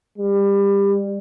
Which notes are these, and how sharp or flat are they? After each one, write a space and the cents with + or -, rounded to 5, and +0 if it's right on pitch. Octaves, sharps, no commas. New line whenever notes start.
G3 +25